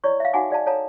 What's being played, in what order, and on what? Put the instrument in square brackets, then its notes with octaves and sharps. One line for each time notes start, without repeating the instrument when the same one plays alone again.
[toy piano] E4 C#5 D5 C#6
E5 F5
D#4 F#4 F#5 G#5 D6
G#4 D5 F5 A5
A4 C#5 F5 A5 A#5